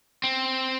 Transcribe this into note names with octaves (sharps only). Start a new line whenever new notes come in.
C4